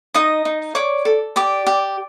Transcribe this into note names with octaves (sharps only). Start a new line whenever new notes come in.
D#4 D#5 D#6
D#4
C#5 D5 D6
A4
G4 D5 D6
G4